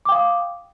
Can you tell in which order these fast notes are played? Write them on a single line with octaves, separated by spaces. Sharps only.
D6 G5 F5 D#6